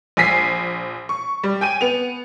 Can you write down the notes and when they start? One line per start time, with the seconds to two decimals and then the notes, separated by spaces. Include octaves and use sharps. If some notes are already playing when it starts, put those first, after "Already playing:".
0.17 A#1 G#5 B6 C7
1.09 C#6
1.43 G3
1.61 G5 G#5 D#7
1.81 B3 F7